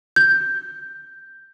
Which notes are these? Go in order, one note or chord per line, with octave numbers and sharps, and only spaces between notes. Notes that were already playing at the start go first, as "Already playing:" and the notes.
G6